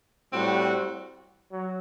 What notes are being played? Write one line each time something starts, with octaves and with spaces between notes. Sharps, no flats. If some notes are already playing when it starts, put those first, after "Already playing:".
A2 G3 C4 F#4
F#3